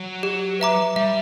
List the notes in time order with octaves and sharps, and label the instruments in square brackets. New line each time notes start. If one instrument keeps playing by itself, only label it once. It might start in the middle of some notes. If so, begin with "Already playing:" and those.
Already playing: [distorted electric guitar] F#3
[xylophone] G4
B4 E5 A#5 D6
[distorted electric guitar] G3 [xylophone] E5